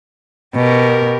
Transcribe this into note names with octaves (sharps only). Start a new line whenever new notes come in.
B2 G4 A#4